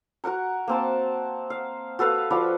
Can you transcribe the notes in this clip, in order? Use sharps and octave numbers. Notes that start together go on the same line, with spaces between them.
F#4 A#4 F#5 A#5
A#3 C4 A5
F5
F#4 A4 B4 F5
F3 F#4 D5 B5